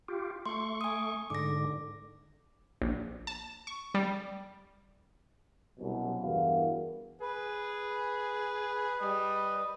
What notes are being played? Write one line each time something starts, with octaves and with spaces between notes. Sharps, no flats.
F4 G4
A3 C6 C#6
G#5 D#6
G#2 D3 D6 A#6
A#1
A5
C#6
G3
C2 F#2 B2
E2 G2 E3 F#4 A#4 F5
G#4 B4
G3 D#5